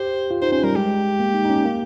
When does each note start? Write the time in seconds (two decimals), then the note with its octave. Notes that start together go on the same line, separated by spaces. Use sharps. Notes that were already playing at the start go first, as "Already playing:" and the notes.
Already playing: G4 C5
0.31 F4
0.42 D#4 C5
0.52 C#4 C5
0.64 G3 A#4
0.76 G#3 G4
1.20 A#3
1.34 D#4
1.45 D#4
1.49 C#4
1.65 A#3